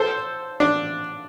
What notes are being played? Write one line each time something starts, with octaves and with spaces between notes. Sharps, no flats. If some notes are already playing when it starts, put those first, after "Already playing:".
Already playing: A4 C5
D4